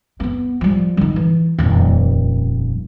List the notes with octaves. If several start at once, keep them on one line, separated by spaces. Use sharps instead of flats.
A#3 B3
F3 G3
D3 D#4
E3
D#1 F2